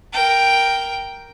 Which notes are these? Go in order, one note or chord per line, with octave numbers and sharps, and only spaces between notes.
A#4 G5